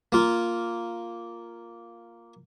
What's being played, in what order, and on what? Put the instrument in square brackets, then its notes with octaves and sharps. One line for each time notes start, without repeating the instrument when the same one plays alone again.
[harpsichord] A#3 F4